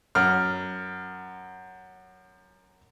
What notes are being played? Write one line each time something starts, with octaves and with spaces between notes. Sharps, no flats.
F#2 F6